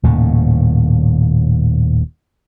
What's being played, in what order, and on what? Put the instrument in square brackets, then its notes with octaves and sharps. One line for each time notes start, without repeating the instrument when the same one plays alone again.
[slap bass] D#1 D#2 A2 C#3